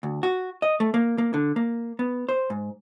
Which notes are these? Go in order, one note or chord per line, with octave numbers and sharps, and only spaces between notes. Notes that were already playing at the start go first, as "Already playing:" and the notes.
D2
F#4
D#5
A3
A#3
A#3
D3
A#3
B3
C5
G#2